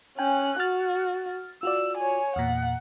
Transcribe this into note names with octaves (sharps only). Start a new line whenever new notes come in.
C#4 G5 G#5 F#6
F#4 F6 A6
F4 F#4 D5 E6
C#5 G#5
E2 A#2 F#5